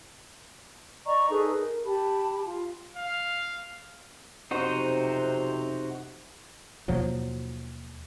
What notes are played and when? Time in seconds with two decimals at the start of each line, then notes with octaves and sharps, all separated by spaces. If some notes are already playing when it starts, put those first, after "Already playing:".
1.05 D5 D#5 A#5 C#6
1.30 D#4 G#4 A4 B4
1.59 A#4
1.85 G4 A5 B5
2.44 F4
2.96 F5
4.51 B1 F2 C3 D#4 F#4 C5
6.88 D#2 B2 F3 F#3